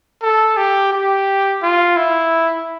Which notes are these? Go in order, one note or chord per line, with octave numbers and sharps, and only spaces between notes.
A4
G4
G4
F4
E4